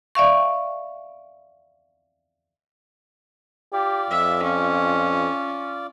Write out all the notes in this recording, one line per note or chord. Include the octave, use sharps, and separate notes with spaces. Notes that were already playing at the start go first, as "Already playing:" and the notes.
D5 E5 F5 C#6
F4 G4 D5
F2 E5
C#4